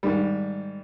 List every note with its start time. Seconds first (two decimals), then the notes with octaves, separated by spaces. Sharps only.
0.03 G#2 D#3 G3